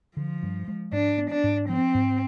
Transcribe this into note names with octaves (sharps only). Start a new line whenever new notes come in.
D3 F3
G2
G#3
G#2 D4
B3
D4
G#2
F3 C4
G#2